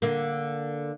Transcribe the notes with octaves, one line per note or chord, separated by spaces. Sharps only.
D3 A#3